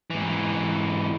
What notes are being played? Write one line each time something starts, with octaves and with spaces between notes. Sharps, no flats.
G#2 E3